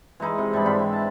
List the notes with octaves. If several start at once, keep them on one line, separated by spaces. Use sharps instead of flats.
E3 G#3 D#4 E4
C3
G#2 G3 D4 B5
G#2 C4 E4 B5
E3
A5